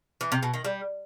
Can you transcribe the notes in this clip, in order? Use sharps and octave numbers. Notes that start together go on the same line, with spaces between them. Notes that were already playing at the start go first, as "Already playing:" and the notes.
E3
C3
B2
D#3
G3